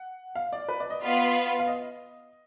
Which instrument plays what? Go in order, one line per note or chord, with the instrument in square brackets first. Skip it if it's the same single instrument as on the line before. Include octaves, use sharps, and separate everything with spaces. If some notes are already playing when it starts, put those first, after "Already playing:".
Already playing: [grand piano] F#5
F5
D5
B4
D5
D#5
[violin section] B3 F4 B4
[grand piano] F5
D#5